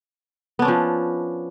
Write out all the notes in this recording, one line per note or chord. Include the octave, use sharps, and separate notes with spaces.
F3 B3 C#4 D4